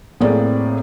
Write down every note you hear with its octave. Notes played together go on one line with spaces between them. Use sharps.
A2 A#3 C4 G#4 D5